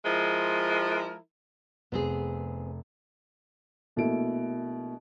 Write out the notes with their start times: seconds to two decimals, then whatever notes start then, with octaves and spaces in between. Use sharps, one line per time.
0.05 F3 G#3 E4 A#4
1.92 F1 B3 C4 G#4
3.96 A#1 B2 A3 A#3 E4 D7